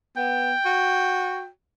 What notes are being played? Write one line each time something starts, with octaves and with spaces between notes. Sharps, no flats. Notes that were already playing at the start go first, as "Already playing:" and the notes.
B3 G5
F#4